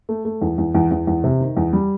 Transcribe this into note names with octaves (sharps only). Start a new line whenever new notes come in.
A3
A3
E2
E2
E2
E2
E2
C3
D#3
E2
G3